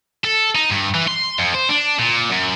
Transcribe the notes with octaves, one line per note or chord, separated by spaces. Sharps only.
A4
D#4
G2
E3
C6
F2
C5
D4
A#2
F#2